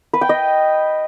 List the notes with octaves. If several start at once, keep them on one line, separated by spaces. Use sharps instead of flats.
B4
G5
D#5